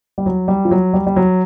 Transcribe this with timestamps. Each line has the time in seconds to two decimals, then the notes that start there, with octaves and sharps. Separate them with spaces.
0.18 G3
0.26 F#3
0.48 G3
0.65 F3
0.71 F#3
0.93 G3
1.07 G3
1.16 F#3